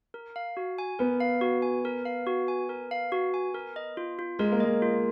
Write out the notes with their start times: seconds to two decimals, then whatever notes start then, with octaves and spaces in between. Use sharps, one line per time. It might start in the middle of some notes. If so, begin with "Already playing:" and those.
0.14 A#4
0.36 F5
0.57 F#4
0.78 G#5
0.99 B3 A#4
1.21 F5
1.41 F#4
1.62 G#5
1.85 A#4
2.05 F5
2.27 F#4
2.48 G#5
2.69 A#4
2.91 F5
3.12 F#4
3.34 G#5
3.54 A#4
3.76 D#5
3.97 F4
4.19 F4
4.39 G#3 A#4
4.52 A#3
4.60 G#3 D#5
4.82 F4